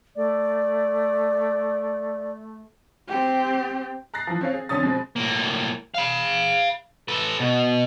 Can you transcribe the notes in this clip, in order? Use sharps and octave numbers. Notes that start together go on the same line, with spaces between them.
A3 D5
C4 G4
A#5 F#6 A6 A#6 C7
E3 F3
C4 C#4 F5
G#4
F2 D3 C#4 D#6 A6
B2 G#3 C4
A2 A#3
F5 B5
A4 B4
B2